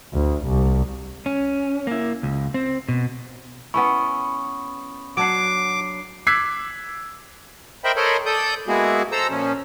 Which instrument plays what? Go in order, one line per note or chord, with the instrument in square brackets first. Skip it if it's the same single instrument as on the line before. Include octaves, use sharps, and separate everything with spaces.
[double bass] D2
C2
[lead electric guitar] C#4
A#3 E4
C#2
C4
B2
[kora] B3 C#4 E4 [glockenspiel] B5 D#6 [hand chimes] C#6
[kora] F#3 D4 F#5 [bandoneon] D6 [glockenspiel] C7 D7
[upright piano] D6 E6 F#6 G#6 B6 C7
[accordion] A#4 C5 D#5 E5 G5 B5
A4 A#4 C5 C#5 D#5 B5
A4 D5 D#6 G6
G#3 A#3 B3 E4 F#4 G#4
A4 C5 A#5 E6
A#2 F3 C#4